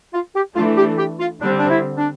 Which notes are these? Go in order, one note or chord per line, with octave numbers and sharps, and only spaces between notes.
F4
G4
E3 A3 D4 F4
G4
G4
F4
D3 G3 C4 D4
D4
E4
D4